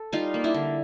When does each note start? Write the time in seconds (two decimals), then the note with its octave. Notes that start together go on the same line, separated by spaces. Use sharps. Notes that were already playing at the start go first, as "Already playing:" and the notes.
Already playing: A4
0.12 G3 D#4 F4
0.34 A#3
0.44 D4 E4
0.54 D3